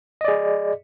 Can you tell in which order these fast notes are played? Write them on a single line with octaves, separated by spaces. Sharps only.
D#5 D5 G#4